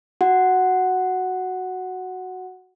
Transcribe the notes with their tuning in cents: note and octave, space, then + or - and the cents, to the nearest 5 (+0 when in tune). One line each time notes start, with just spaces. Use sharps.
F#4 +0 F#5 +0